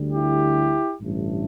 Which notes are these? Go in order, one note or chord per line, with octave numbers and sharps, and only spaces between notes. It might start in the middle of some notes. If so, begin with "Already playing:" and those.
Already playing: D2 D3 G3
E4 G4
A1 G2 D3 A3